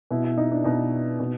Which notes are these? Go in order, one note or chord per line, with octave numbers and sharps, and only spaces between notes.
B2 E4
E4
D#4
D4
B2 D#4
B2